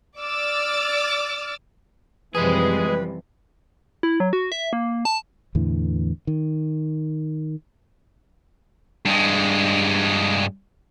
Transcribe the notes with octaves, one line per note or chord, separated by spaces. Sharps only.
D5 D6 E6 F6 A6
F#2 C3 E3 F3 G3 G#3 G#4 B4
E4
F#3
F#4
E5
A#3
A5
E2 A2 D3 E3
D#3
G2 G#3